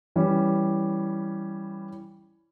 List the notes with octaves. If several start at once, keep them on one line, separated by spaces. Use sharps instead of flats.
E3 G3 C#4